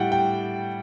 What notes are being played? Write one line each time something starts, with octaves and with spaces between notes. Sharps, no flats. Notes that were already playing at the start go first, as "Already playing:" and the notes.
Already playing: A2 G3 F#5 G5
G5